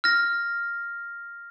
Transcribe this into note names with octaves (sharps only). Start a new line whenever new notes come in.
F6 A#6